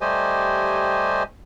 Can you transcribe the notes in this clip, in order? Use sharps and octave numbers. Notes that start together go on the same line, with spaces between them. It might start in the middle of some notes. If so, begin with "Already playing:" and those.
G3 A3 G4 C5 D#5 G#5